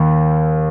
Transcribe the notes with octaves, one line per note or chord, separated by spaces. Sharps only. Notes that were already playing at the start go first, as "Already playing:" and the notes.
Already playing: D#2